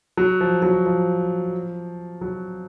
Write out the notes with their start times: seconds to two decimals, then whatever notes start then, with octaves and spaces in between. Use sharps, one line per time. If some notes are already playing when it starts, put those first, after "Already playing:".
0.17 F#3
0.41 F3
0.62 F#3
0.86 F3
2.21 F#3